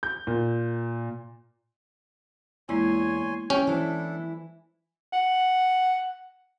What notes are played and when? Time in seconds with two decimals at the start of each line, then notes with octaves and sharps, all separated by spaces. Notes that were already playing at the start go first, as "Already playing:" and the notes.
0.03 G6
0.27 A#2
2.69 E2 G#3 A#3 E4 C#5 G#5 C6
3.50 C#4 E4 G4 G5
3.67 E3 D4 E4 A4 C5
5.13 F#5